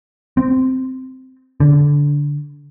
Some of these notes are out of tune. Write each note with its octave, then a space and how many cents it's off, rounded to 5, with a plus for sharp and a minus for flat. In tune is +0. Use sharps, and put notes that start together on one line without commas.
C4 -10
D3 -15